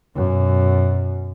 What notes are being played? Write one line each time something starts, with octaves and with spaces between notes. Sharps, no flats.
F#2 B2